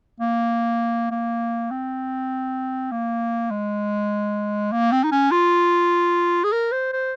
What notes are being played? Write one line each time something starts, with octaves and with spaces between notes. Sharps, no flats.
A#3
A#3
C4
A#3
G#3
A#3
C4
D#4
C#4
F4
G#4
A#4
C5
C5